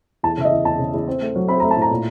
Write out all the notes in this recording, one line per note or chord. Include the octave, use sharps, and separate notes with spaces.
E2 A5
C#3 E5
D#5
E2
E2 A5
C#3
E2
C4
A3
F#3
C4 B5
A3 A#5
A5
A2
A#5
A#2